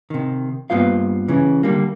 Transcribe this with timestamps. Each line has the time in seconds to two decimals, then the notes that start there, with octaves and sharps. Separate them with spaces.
0.10 C3 D#3
0.70 G2 A#3 B3 F4 C5 F5
1.28 C#3 E3
1.63 D3 G3 A#3